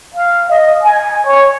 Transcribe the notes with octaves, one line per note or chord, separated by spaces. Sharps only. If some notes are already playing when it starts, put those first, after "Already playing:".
F5
D#5
G#5
C#5